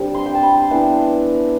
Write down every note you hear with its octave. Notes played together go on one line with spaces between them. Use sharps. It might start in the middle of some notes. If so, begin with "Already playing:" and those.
Already playing: D3 G3 C4
C6
G5
A5
B5
C6
E3 B3 D4